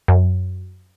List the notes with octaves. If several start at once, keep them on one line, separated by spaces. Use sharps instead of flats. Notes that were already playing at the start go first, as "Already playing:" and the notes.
F#2